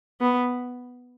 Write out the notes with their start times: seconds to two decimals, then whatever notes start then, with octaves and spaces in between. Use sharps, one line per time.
0.21 B3